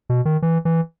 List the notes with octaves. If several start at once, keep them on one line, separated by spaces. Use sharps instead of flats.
B2
D#3
E3
E3